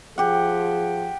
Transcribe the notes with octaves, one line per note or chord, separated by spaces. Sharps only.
F3 G4 G#4 F#5